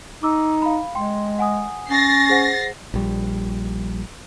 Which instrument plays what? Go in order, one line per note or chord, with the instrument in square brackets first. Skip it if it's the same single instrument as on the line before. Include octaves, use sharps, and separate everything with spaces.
[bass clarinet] D#4 [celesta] D6 E6
[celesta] F5 B5
[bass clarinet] G#3 [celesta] G5 C6
[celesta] F#5 G#5 D#6
[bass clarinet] C#4 [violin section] A6 A#6 C7
[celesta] G#4 C5 F#5
[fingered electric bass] A#1 G3